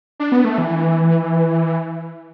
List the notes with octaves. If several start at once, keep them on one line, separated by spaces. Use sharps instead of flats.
D4
B3
A3
E3